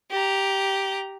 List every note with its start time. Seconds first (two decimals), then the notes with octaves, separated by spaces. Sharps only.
0.11 G4 A#5